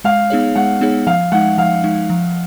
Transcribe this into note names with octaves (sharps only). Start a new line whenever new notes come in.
G#3 F5
B3 D#4 G#4 C#5
G#3 F#5
B3 D#4 G#4 C#5
F3 F5
G#3 D#4 F#5
F3 F5
G#3 D#4
F3